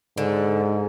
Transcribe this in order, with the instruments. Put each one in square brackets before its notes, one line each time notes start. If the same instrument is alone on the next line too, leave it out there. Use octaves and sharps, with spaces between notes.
[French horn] G#2 [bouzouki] D3